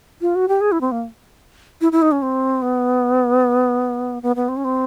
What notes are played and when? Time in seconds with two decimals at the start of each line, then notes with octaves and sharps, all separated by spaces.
0.21 F4
0.35 F#4
0.49 G4
0.61 G#4
0.72 E4
0.81 C4
0.92 A#3
1.81 E4
1.92 E4
2.02 D#4
2.12 C#4
2.22 C4
2.62 B3
4.23 B3
4.36 B3
4.49 C4
4.57 C#4
4.65 C4